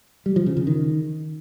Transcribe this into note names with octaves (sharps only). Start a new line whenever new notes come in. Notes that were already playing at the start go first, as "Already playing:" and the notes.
G3
F3
C#3
C#3
D#3